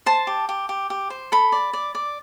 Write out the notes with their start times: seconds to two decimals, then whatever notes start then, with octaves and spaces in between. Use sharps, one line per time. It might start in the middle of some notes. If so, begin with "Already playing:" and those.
0.06 C5 A5
0.27 G4
0.49 G4
0.69 G4
0.90 G4
1.10 C5
1.32 A4 B5
1.52 D5
1.73 D5
1.95 D5